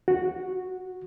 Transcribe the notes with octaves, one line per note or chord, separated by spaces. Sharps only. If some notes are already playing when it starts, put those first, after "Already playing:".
F#4